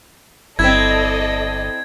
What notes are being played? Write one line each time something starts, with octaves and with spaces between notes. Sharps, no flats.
G1 C4 E4 A4 D5 D#5 G#6